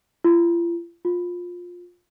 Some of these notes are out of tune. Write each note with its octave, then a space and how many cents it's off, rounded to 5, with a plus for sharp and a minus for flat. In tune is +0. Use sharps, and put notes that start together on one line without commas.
F4 -40
F4 +15